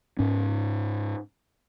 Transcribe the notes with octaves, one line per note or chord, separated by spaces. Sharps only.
G#2 C#4